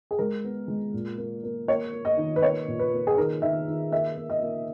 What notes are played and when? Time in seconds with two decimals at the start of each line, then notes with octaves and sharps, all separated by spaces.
0.11 G#4
0.19 G#3 A#4
0.44 B3
0.68 G#3
0.94 A#2
1.18 A#3
1.44 A#3
1.68 A#3 C#5
1.93 A#3
2.05 D#5
2.17 D#3
2.36 B4
2.42 A#3 C#5
2.68 A#2
2.80 B4
2.93 A#3
3.07 G#4
3.17 D#3 A#4
3.42 D#3 E5
3.68 D#3
3.92 A#3 E5
4.16 A#3
4.30 D#5
4.43 A#3